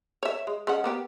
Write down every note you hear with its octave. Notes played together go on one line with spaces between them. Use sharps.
C#5 E5
G#3
G#3 C#4 F#5
A#3 B3 G4